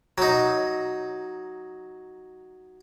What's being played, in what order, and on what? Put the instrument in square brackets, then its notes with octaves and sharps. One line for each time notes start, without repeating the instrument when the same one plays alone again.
[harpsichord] F#3 D#4